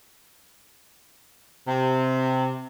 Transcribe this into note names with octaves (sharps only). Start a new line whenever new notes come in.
C3